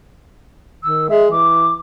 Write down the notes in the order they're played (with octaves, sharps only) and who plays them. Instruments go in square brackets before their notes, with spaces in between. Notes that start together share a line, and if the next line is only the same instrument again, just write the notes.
[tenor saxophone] D#3 [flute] E6
[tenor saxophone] G#3 [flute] E5
[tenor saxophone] E3 [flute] D6